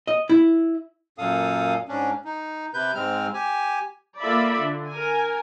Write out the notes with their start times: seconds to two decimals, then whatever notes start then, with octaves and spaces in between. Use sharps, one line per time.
0.07 D#5
0.29 E4
1.18 F#2 A#2 A4 F5 D#6
1.89 G#2 C#4 D4
2.25 D#4
2.74 C3 B4 G6
2.95 G#2 G#3 C4 F6
3.34 G4 G#5
4.19 A#3 F4 A4 D5 E5 B5
4.59 D3
4.89 A#4 G#5